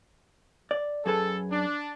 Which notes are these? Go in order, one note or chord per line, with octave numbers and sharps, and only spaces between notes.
D5
F#2 G#4 A4 B4
D4